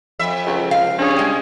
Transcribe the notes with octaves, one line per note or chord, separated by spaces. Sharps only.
F2 E5
C#2
F5
C#4 D4 G4 G#4
G3 G#3